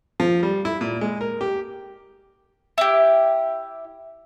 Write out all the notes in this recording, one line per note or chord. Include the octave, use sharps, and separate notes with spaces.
F3
G3
E4
A#2
G#3
A#4
G4
E4 G4